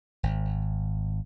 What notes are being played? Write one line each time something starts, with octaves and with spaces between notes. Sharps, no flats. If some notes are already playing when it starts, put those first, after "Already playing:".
G#1